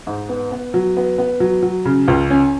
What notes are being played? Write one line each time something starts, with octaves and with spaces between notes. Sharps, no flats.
G#2
B3
B3
F#3
B3
B3
F#3
F#3
C#3
C#2
C#4